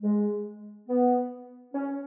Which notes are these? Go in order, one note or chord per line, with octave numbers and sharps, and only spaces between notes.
G#3
B3
C#4